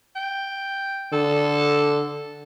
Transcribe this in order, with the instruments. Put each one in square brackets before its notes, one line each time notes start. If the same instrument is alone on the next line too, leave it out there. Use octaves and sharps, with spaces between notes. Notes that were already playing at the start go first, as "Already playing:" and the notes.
[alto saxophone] G5
[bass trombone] D3 [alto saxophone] A4